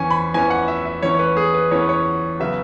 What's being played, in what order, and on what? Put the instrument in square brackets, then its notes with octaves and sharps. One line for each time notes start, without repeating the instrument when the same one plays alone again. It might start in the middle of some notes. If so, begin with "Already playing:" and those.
Already playing: [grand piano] E2 E3 C#4 G#5
B5
E2 E3 C#4 G#5
F#5
E5
E5
E2 E3 C#4 C#5
C#5
B4
G#4
B4
E2 E3 C#4 C#5
B4
C#5
C#3 F#3 B3 E5